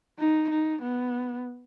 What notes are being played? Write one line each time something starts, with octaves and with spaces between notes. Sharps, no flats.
D#4
D#4
B3